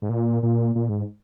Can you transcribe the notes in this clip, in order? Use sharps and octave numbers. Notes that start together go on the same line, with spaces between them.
G#2
A#2
A#2
A#2
G#2